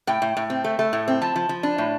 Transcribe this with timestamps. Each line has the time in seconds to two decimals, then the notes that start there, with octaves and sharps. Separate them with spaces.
0.07 A2 G5
0.22 A2
0.37 A2
0.50 C4
0.64 A3
0.79 A3
0.93 A2
1.08 C4
1.22 F3 A5
1.36 F3
1.49 F3
1.63 D4
1.78 A2